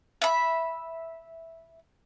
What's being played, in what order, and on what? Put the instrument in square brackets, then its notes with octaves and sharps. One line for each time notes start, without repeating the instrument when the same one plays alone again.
[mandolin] E5 B5